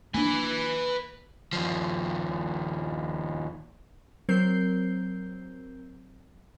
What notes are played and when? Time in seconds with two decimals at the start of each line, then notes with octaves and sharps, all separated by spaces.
0.14 A#3 D4 B4 G#5
1.53 D#2 F3
4.29 F#3 C4 A#4 G6 C7